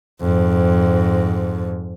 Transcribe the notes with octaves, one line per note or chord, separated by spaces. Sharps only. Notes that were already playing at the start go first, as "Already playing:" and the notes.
F2 G#2